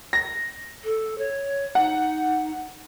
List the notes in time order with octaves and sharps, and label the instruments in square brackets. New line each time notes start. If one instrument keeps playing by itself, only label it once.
[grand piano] A#6
[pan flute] A4
C#5
[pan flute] D#4 [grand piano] F#5